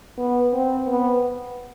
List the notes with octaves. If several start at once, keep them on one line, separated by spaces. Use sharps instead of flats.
B3
C4
B3